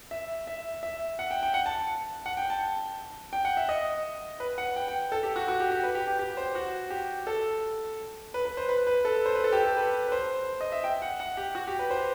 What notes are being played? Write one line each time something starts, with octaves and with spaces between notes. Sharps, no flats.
E5
E5
E5
F#5
G5
G5
F#5
A5
F#5
G5
A5
G5
F#5
E5
D#5
B4
F#5
G5
G5
A4
G4
F#4
F#4
G4
G4
B4
G4
G4
G4
C5
F#4
G4
A4
B4
B4
C5
B4
B4
A4
C5
B4
A4
G4
A4
B4
B4
C5
D#5
E5
G5
F#5
F#5
G4
F#4
G4
B4
C5